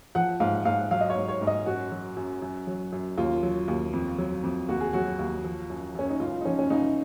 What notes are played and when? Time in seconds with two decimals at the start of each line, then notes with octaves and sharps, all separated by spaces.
0.15 F3 F#5
0.40 G#2 F5
0.65 G#2 F5
0.91 F#3 F5
1.01 D#5
1.10 C#5
1.16 G#2
1.28 C#5
1.41 G#2
1.47 D#5
1.66 F#2 F#4
1.92 F#3
2.16 F#2
2.42 F#2
2.67 F#3
2.92 F#2
3.17 D#2 F4
3.43 F#3
3.68 D#2
3.93 F2
4.18 F#3
4.43 F2
4.69 D#2 F#4
4.81 G#4
4.93 F#3 F#4
5.19 D#2
5.44 F3
5.70 F#2
5.95 F#2 C#4
6.09 D#4
6.20 C#2 F4
6.41 D#4
6.45 F3 C#4
6.59 C#4
6.70 C#2 D#4